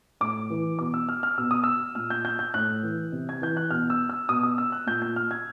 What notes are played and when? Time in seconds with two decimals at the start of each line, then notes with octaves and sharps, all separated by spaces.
0.21 A2 D6
0.50 E3
0.79 B2 D6
0.94 E6
1.09 F6
1.23 F6
1.38 B2 E6
1.51 D#6
1.64 E6
1.95 A#2 F6
2.10 G6
2.25 G6
2.39 G6
2.54 A2 F#6
2.83 E3
3.12 C3
3.29 G#6
3.42 E3 G6
3.57 F#6
3.71 B2 F6
3.90 E6
4.09 E6
4.29 B2 D#6
4.43 D#6
4.58 E6
4.72 F#6
4.87 A#2 G6
5.02 G6
5.16 F6
5.31 G#6